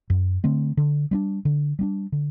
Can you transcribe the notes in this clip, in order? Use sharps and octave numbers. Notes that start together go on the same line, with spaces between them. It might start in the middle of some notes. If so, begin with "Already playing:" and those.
F#2
D3 A3 C4
D3
G3 B3 D4
D3
G3 B3 D4
D3